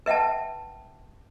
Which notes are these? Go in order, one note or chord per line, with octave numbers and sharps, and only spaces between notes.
B4 E5 F#5 G5 A5